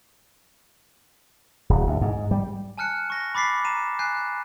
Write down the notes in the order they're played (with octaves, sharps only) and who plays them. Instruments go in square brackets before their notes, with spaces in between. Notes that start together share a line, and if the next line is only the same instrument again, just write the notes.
[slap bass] D1
D2
G#2
G3
[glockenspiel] G#5 A5 F6 F#6 C#7
C#6 A#6 G7
B5 D6 A6 B6 C7
A#5 D#7 E7
G#5 F#6 G6 C7